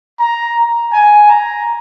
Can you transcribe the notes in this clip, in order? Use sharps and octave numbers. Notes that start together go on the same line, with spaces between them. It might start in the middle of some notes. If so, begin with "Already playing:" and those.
A#5
G#5
A#5